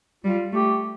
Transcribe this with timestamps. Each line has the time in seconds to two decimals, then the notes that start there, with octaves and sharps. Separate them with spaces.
0.24 G3 F4
0.53 A3 G4